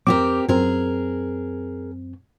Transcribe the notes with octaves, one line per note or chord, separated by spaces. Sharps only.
F2 C4 G4 A#4 D6
F#2 C4 G#4 A#4